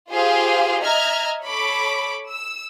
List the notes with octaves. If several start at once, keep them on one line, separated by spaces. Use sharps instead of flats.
F4 G4 G#4 C5 F5
D#5 E5 A#5 F6 G#6
A4 C#5 B5 D6
E6